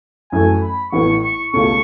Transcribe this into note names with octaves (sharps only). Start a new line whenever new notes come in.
F#2 E3 A3 G#5
B5
A1 A2 E3 B3 C#6
C#6
C#2 B2 A3 C#4 C#6